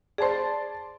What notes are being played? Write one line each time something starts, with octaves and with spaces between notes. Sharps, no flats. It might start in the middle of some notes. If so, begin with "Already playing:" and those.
G#4 C5 D5 A5 C6